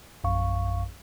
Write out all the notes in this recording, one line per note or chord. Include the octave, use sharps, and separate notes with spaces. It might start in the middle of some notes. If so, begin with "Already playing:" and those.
A#1 F#2 F5 C#6